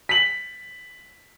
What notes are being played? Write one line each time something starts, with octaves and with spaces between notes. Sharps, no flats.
B6 F#7